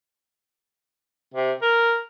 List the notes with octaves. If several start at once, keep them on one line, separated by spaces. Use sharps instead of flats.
C3
A#4